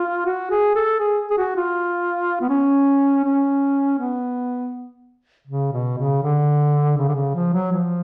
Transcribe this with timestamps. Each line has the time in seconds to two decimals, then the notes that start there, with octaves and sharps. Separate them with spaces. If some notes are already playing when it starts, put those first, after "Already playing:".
Already playing: F4
0.26 F#4
0.51 G#4
0.75 A4
1.00 G#4
1.31 G#4
1.38 F#4
1.56 F4
2.41 B3
2.49 C#4
3.24 C#4
3.99 B3
5.47 C#3
5.72 B2
5.98 C#3
6.23 D3
6.98 C#3
7.08 D3
7.15 C#3
7.35 F3
7.54 F#3
7.72 F3